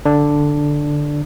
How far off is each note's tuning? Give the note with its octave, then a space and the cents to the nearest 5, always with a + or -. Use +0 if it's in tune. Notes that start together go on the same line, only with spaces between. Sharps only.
D3 +0 D4 +0